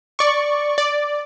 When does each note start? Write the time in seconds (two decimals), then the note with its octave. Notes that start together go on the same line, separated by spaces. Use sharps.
0.19 D5 C#6
0.78 D5